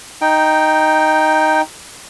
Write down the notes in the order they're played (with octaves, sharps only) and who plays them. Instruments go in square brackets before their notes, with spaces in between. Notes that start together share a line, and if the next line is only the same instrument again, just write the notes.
[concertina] D#4 G5